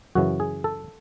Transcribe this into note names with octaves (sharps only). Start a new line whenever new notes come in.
F#2 C#3 E3 F#4
G#4
A4